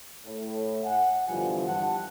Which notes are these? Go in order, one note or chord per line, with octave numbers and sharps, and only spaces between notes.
A2
F#5 G#5
G2 B2 D3 E3 F3
G2 F#5 A5